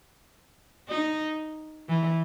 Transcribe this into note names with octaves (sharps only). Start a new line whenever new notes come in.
D#4
E3